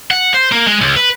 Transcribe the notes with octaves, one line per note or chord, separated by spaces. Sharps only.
F#5
C5
A#3
G#3
C#2
B4